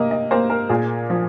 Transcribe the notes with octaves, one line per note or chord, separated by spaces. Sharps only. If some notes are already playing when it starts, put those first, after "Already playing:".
Already playing: C3 A#3 D#5
D#5
A#3 C5
A#4
A#2 G#4
F3